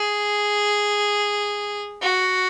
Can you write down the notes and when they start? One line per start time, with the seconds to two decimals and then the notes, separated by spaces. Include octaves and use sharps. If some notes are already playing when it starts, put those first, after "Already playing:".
Already playing: G#4
2.02 F#4